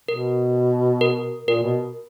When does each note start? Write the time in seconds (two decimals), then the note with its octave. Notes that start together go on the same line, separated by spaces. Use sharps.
0.08 B2 A#4
1.01 A#4
1.48 A#2 A#4
1.63 B2